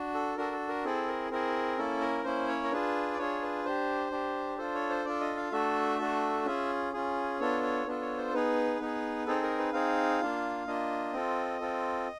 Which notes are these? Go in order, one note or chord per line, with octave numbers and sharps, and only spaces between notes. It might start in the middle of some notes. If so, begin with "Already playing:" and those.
Already playing: D4 F#4
A4
D4 F#4 A4 A#4
A4
A#4
C4 E4 G#4 A4
A#4
C4 E4 G#4 A#4
A#3 C#4 E4 A4
A#4
A#3 C#4 E4 C5
C#5
A#4
D4 F4 G#4 B4
D5
D4 F4 G#4 C#5
B4
D4 G4 C5
D4 G4
D4 F4 A4 C5
C#5
C5
D4 F4 A4 D5
D#5
F5
A3 D4 F#4 A4 E5
A3 D4 F#4 A4
C#4 F4 G#4 E5
C#4 F4 G#4
B3 D4 F4 A4 C#5
C#5
B3 D4 F4 A4
C#5
C5
B3 D#4 G#4 B4
B3 D#4 G#4
C4 D#4 G#4 A4
A#4
B4
C4 D#4 G#4 F5
A#3 D4 F4
A#3 D4 F4 D#5
C4 F4 A4
C4 F4 A4